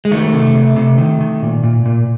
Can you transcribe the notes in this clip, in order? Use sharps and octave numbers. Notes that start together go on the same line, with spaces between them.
G#3
D#3 A3
C3
C3
C3
D#3
D#3
A#2
A#2
A#2